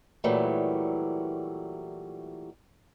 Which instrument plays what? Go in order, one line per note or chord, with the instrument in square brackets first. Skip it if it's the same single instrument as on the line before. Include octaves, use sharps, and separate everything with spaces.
[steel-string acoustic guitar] A#2 E3 F#3 G3 A3